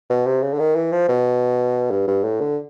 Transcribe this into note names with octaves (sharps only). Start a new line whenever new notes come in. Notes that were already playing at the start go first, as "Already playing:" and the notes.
B2
C3
C#3
D3
D#3
E3
F3
B2
G2
G2
A2
D3